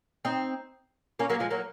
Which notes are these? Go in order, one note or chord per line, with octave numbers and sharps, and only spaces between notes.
C4 D#4
A#3 C#4
F#3 A#3
F3 G#3
F#3 A#3